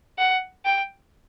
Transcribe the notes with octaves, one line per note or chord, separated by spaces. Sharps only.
F#5
G5